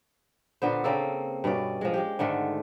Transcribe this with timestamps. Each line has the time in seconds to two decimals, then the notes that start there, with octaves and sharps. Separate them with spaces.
0.62 A#2 D3 B3 C5
0.84 C#3 A#3 C4 A4
1.44 G2 B2 C#4 D5
1.81 F3 G#3
1.94 G#3 G4
2.19 G#2 D3 D#3 A3